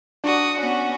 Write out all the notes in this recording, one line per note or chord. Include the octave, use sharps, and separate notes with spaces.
D4 F#4 D#6
B3 C#4 F#4